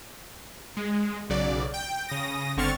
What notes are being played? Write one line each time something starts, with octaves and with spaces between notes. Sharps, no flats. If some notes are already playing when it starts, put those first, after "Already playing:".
G#3
B1 C#3 F#3 D5
G5
C#3 D#6 A#6
G1 D3 C4 C#6 F6 A6